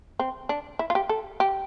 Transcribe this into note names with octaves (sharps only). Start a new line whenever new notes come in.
C4
D4
E4
F4
G4
A4
G4